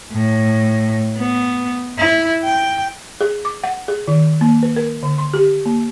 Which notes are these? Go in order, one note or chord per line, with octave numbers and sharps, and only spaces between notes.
A2
B3
E4
G5
G#4
D6
F#5
G#4
D#3
A#3
B4
A#4
D3
C6
G4
A#3